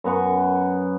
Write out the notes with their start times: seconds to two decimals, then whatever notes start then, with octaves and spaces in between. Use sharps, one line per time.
0.04 F#2 B3 C#6